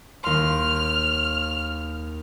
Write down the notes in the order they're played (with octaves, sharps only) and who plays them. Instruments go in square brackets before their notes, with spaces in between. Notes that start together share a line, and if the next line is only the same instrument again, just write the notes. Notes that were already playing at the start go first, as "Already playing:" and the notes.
[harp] D#2 C6 [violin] F6